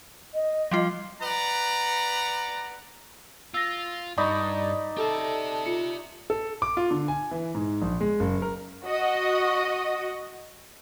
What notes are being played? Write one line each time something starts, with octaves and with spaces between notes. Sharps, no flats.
D#5
F3 G3 F4
B4 D5 F#5 A#5
F4 E6 A6 A#6
G2 D#4 D5 B5 C#6
G4 A4 E5
F4 C#7
A4
D6
F4
D3
G#5
E3
G#2
A#1
G#3
F#1
A#4
F#4 D#5